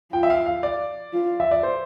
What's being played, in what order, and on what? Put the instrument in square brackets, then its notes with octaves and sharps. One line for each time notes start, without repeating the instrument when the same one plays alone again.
[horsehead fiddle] F4 [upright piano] G5
[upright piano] E5
F5
F5
D5
[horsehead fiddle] F4
[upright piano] E5
D5
C5